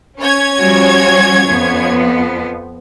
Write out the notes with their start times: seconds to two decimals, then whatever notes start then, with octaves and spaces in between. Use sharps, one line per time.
0.20 C#4 C#5 G#6
0.58 F3 G3 F#4
1.48 F2 F3 B3